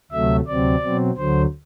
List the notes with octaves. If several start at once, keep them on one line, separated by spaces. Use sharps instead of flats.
D2 C3 F#3 A3 E5
D2 C3 F#3 C4 D5
B2 F#3 C4
D2 D3 F#3 C5